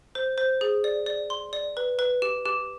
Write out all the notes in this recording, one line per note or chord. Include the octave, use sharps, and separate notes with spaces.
C5
C5
G#4
D5
D5
C6
D5
B4
B4
G4
G4